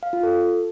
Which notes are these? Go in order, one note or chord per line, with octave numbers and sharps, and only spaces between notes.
F5
F4
A4